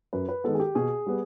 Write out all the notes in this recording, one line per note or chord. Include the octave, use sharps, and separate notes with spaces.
F#2 B4
B4
D#3 G#3 B3 A4
G#4
G4
B2 G#4
G3 B3